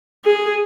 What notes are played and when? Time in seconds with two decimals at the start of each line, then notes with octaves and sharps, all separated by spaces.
0.25 G#4